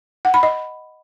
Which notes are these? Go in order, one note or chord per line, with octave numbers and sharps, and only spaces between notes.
F#5
B5
D#5